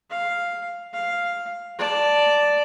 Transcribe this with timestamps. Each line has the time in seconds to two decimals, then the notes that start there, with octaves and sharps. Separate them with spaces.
0.10 F5
0.93 F5
1.79 D5 A5